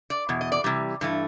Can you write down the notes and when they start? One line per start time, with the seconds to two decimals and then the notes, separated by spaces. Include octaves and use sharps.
0.10 D5
0.29 E2 B2
0.41 D#5
0.52 D5
0.64 C3 E3 G3
1.01 G2 E3 A3